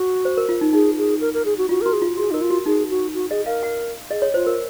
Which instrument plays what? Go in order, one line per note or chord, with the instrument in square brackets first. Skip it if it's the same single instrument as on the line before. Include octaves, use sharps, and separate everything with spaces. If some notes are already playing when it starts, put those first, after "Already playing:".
Already playing: [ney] F#4
[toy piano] C5
A#4
F4
D#4
[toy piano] D#4 [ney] G#4
[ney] G#4
A#4
A#4
G#4
F#4
[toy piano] F4 [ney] F#4
[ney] A#4
[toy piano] F#4
[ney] G#4
[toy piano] F4
[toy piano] F#4 [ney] G#4
[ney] D#4 [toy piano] A#4
[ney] F4
[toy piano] F#4
[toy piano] D#4 [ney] G#4
[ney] F#4
F#4
[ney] G#4 [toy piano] D#5
[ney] A#4 [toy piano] F5
[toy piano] F#5
[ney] G#4 [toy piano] D#5
[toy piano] C#5
[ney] F4 [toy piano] C5
[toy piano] A#4